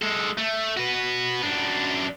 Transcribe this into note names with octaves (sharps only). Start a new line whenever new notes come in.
G#3 A4
A3
F#4 B4
F#2 D4